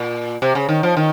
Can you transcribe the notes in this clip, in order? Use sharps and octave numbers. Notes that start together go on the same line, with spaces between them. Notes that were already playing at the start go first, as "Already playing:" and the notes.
Already playing: A#2
C3
C#3
D#3
F3
D#3